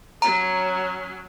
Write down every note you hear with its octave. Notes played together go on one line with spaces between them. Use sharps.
F#3 C#4 A#5